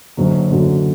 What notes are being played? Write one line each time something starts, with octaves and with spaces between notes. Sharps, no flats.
F#1 F#2 D3 F#3
F#1 F#2 D3 F#3